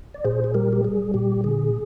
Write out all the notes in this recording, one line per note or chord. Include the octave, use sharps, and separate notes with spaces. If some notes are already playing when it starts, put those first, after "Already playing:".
D5
A#2 G#4 C5
G#4
G3 G4 A#4
G4
G3 G#4
A#2 G4
D3 G#4